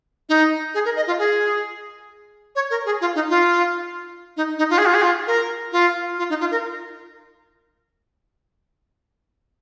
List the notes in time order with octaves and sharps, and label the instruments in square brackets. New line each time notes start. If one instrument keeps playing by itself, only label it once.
[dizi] D#4
G#4
A#4
D#5
F4
G#4
C#5
A#4
G#4
F4
D#4
F4
D#4
D#4
F4
G#4
F4
G#4
F4
A#4
F4
F4
D#4
F4
A#4